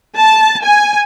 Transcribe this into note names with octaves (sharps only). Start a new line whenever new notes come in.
A5
G#5